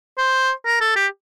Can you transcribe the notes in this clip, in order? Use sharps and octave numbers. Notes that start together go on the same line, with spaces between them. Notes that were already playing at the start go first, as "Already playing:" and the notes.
C5
A#4
A4
G4